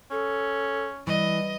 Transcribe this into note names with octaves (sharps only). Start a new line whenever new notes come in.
C#4 A4
E3 G3 D#5